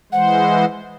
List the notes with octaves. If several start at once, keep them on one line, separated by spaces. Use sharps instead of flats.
E3 G#3 C5 F#5